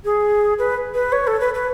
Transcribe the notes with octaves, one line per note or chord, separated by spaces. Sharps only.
G#4
B4
B4
C#5
A4
B4
B4